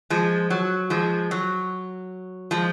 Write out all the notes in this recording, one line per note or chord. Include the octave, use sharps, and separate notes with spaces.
F3 G#3
F#3
F3 G#3
F#3
F3 G#3